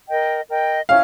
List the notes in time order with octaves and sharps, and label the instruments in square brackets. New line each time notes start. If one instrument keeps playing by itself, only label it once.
[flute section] A#4 D#5 G5
A#4 D#5 G5
[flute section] C#4 E4 [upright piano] F5